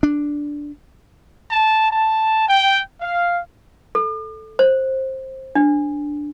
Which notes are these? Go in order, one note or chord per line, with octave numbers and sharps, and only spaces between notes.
D4
A5
A5
G5
F5
A4
C5
D4